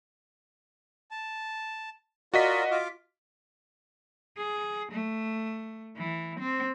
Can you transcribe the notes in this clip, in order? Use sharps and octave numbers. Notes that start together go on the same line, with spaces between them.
A5
F4 F#4 A#4 D5 D#5 B6
F4 F5 D6
G#4
A3
E3
C4